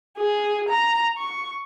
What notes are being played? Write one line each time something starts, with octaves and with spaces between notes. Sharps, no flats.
G#4
A#5
C#6